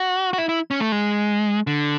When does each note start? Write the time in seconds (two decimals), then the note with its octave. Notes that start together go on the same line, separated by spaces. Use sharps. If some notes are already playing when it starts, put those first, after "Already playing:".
Already playing: F#4
0.33 F#4
0.38 E4
0.49 E4
0.71 C#4
0.80 A3
0.92 G#3
1.67 D3